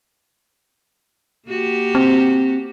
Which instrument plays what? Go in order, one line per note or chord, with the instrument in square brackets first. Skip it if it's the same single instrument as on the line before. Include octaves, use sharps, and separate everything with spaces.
[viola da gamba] A#3 F#4 G4
[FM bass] C4